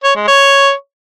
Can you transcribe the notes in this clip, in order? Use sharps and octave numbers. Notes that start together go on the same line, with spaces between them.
C#5
G#3
C#5